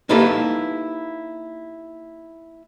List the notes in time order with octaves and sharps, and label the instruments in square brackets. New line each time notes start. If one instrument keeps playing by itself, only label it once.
[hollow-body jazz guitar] A#3 D#4 E4 G4 A4 B4